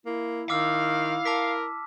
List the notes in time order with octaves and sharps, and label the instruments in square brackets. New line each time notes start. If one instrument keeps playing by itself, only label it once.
[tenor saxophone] A#3 [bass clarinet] E4
[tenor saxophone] D#3 [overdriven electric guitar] F5 [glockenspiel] D6 E6 F6
[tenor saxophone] A#4 [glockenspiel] A5 D6 B6